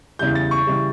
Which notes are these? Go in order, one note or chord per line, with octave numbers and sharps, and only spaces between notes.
E2 C#3 E3 G3 G6
A6
C#6
C#3 E3 G3